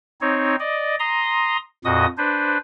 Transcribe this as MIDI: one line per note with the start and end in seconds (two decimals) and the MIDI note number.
0.21 0.56 60
0.21 0.56 63
0.21 0.56 73
0.59 0.96 74
0.59 0.96 75
0.99 1.57 82
0.99 1.57 84
0.99 1.57 87
1.85 2.06 41
1.85 2.06 46
1.85 2.06 66
1.85 2.06 75
1.85 2.06 87
2.18 2.58 62
2.18 2.58 71
2.18 2.58 72